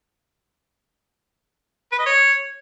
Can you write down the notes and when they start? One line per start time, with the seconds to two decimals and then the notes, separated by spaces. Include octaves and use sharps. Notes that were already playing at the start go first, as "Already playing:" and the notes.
1.92 B4
1.99 D#5
2.06 C#5